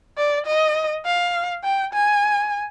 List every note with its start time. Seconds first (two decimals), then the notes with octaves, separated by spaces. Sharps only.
0.18 D5
0.46 D#5
1.06 F5
1.64 G5
1.93 G#5